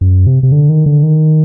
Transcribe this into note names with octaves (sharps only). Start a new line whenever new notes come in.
F#2
C3
C3
D3
D#3
D3
D#3